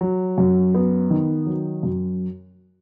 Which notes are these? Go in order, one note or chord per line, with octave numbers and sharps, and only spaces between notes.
F#3
F#2
B3
D#3
F#3
F#2